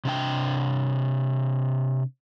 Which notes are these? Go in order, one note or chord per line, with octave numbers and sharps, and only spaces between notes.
C3 D4 G5